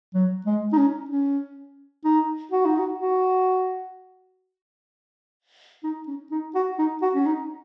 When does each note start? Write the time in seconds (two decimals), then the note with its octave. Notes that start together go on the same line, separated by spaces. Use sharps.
0.14 F#3
0.46 G#3
0.73 D#4
0.77 C#4
1.09 C#4
2.04 D#4
2.51 F#4
2.65 D#4
2.79 F#4
2.99 F#4
5.84 D#4
6.07 C#4
6.31 D#4
6.55 F#4
6.79 D#4
7.02 F#4
7.15 C#4
7.26 D#4